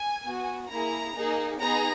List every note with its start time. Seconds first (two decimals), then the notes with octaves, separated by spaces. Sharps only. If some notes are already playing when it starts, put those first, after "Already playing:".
Already playing: G#5
0.25 B3 F#4
0.70 A#3 E4 G#4 A#5
1.15 A#3 D#4 G#4
1.60 B3 D#4 G#4 A#5